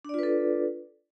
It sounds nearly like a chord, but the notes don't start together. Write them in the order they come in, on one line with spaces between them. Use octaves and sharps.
D4 D5 F4 B4 A4